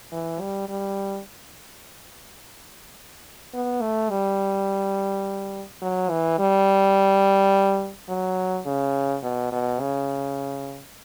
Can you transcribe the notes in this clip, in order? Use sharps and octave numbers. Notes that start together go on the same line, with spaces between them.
E3
G3
G3
B3
A3
G3
F#3
E3
G3
F#3
C#3
B2
B2
C#3